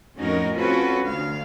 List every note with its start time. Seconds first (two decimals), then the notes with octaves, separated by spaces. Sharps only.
0.17 F2 A2 C#4 D#4 F#4 A#4
0.57 C4 C#4 F4 F#4 A4 B4
1.04 D2 F5